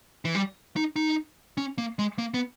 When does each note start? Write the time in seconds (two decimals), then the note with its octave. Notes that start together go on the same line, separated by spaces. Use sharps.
0.25 E3
0.35 G3
0.76 D#4
0.96 D#4
1.57 C#4
1.78 A#3
1.99 G#3
2.19 A#3
2.34 B3